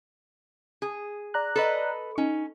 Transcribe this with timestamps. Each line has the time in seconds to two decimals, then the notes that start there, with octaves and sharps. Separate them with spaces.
0.82 G#4
1.34 D5 A#5 F#6
1.56 A4 B4 D#5
2.18 C#4 D#4